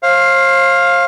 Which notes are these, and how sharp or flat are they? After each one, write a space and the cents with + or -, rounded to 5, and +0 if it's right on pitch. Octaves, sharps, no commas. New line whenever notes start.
C5 +40 F5 +0